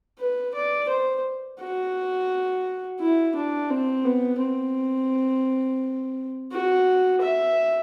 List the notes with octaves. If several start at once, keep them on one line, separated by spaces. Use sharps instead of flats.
B4
D5
C5
F#4
E4
D4
C4
B3
C4
F#4
E5